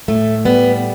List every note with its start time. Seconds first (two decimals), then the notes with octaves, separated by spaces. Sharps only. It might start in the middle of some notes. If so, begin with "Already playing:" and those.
0.08 A2 A3
0.45 G3 B3